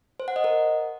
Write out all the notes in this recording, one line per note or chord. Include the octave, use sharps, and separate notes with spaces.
C5
F#5
D#5
A#4